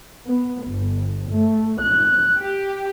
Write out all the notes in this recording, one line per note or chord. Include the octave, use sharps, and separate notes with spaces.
B3
G1
A3
F#6
G4